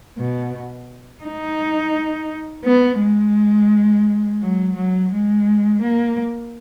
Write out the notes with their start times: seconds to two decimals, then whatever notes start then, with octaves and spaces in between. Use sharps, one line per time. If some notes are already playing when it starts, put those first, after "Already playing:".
0.18 B2
1.23 D#4
2.65 B3
3.00 G#3
4.41 F#3
4.76 F#3
5.12 G#3
5.83 A#3